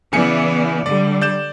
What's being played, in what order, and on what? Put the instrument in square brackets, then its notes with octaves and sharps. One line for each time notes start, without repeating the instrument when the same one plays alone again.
[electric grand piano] C#3 G#5 C#7 [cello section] E3 B3 D5
[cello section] D3 G3 [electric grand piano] D5
[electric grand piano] D5 G6 E7